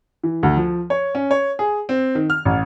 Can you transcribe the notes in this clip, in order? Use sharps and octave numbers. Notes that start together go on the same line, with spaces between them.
E3
D2
F3
C#5
C#4
C#5
G#4
C4
D#3
F6
A1